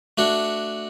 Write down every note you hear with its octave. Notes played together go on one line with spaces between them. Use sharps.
A3 D4 F#4